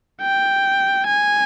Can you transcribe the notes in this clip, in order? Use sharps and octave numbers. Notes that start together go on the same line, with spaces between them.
G5
G#5